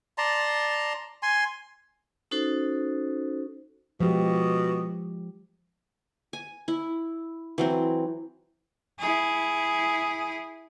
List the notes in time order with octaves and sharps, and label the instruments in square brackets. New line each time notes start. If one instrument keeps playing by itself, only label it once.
[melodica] D5 A5 A#5 C6
G#5 C6
[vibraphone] C#4 D#4 F#4 A4 C5
[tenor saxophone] B2 [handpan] F3 G#3 G4
[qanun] G#5
E4
E3 F#3 C4
[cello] E4 G#4